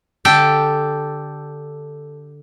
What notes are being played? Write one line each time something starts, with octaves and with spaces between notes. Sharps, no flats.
D3 G4 A4 G5